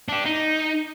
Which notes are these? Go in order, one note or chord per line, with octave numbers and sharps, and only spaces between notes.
D4 G4
D#4